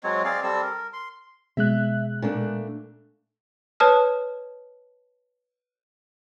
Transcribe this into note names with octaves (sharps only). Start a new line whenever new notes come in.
F#3 G#3 C4 C#5
C4 G#4 D5 F5
G3 C4 A4 E6
A#4
C6
B2 G#3 E5 F#6
A#2 A3 D4
B4 C#5 A5 D#6 F6